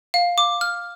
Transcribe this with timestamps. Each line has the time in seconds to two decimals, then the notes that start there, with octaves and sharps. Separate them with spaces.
0.14 F5
0.38 D6
0.61 F6